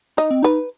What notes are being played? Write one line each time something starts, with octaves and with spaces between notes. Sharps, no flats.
D#4 D#5
C4
D#4 B4